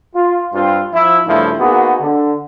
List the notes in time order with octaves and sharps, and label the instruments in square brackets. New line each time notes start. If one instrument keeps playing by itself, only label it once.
[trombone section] F4
G2 C4 F4
F3 E4
G2 C#3 F3 A3 E4
A#3 B3 D#4 F#4 G#4
D3